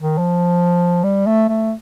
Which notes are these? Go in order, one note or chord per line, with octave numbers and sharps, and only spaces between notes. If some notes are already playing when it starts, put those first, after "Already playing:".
D#3
F3
G3
A3
A3